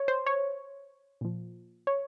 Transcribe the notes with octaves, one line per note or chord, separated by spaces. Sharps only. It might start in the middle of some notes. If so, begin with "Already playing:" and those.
Already playing: C#5
C5
C#5
A#2 F3
C#5